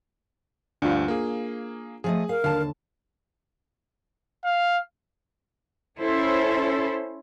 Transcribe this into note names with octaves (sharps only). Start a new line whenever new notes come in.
D2 G2 D4 F4
A#3 G#4
F3 A3 G#4 D#5
A#4 F5
D#2 D3 F5 A5
F5
C#4 E4 A4 C5